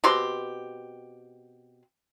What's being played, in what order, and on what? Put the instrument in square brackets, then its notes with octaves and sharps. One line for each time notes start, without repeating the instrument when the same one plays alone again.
[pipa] B2 C4 G4 C6